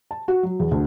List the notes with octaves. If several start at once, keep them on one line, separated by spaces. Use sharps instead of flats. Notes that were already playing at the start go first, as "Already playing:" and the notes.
A5
F#4
F#3
E2
D2